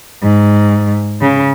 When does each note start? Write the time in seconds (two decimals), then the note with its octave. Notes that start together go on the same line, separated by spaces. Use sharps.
0.23 G#2
1.20 C#3